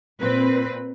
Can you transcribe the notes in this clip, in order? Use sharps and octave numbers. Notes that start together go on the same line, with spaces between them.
A#2 C4 B4